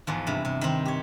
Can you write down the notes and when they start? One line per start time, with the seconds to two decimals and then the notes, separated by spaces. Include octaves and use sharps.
0.07 E2 G#2 F3
0.27 G2 C3
0.45 C3
0.61 D#3 C4
0.85 G4 C#5